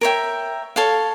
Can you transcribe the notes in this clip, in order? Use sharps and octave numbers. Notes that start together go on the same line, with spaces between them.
A#4 C#5 E5 G5
A4 C#5 F5